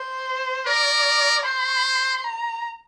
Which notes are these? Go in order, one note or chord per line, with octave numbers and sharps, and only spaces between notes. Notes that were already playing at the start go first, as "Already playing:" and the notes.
Already playing: C5
A#4 D5
C5 C6
A#5